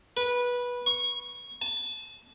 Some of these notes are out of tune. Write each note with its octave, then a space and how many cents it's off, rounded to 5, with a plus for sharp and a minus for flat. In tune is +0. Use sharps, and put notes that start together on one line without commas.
B4 -15
C#6 -15
A5 -35